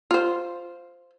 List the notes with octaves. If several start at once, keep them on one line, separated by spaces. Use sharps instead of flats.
F4 C5